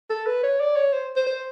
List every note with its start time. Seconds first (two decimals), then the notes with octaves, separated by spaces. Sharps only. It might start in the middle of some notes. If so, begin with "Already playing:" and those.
0.10 A4
0.27 B4
0.43 C#5
0.60 D5
0.76 C#5
0.93 C5
1.16 C5
1.27 C5